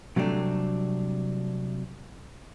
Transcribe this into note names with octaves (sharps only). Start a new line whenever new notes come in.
C3 F#3 G3 A3 C4 D4